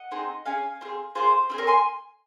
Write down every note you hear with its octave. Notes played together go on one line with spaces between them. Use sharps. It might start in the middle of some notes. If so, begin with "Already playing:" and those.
Already playing: D#5 F#5
C4 D#4 G#4
C#4 G#4 F5 G#5
C4 F4 G#4
A#3 F4 G#4 C5
C4 F4 G#4 C5
A#4 C#5
G#5 C6